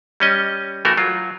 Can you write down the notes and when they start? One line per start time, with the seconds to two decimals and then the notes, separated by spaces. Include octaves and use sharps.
0.20 G3 C#4 D#5
0.85 E3 A3 F#4 A#4
0.97 F#3 F4